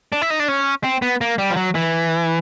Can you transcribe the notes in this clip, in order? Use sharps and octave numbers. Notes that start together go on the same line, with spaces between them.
D4
E4
D#4
D4
C#4
C4
B3
A#3
G3
F3
F#3
E3